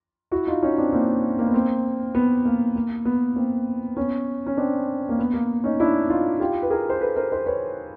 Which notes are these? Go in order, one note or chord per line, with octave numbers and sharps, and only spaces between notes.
E4 F#4
D#4 F4
C#4 D#4
C4 D4
A#3 C4
A#3
B3
A#3 C4
B3
A#3
A#3
B3
A#3 C4
B3 C#4
C#4
C4 D4
A#3
B3
A#3
C#4 D#4
D4 E4
D#4 F4
F4 G4
B4
G#4 A#4
C5
A4 B4
A#4 C5
A#4 C5
B4 C#5